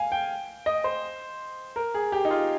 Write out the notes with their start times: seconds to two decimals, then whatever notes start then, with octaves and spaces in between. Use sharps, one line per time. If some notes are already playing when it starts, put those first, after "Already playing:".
Already playing: F5 G#5
0.12 G5
0.66 D#5
0.84 C5
1.76 A#4
1.94 G#4
2.12 G4
2.25 D#4
2.31 F4